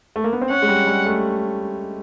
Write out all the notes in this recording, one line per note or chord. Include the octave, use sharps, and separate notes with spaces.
A3
A#3
B3
C4
C#4 F#5
G#3
G3
G3
A3